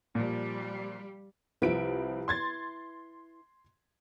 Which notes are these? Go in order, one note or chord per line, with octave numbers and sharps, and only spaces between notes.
A#2 F3 G3 G4
C2 F3 E4 B4 D7
C6 G#6 A6